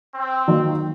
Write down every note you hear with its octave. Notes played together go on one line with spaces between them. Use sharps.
C4
D#3 F#3 A#3 D#4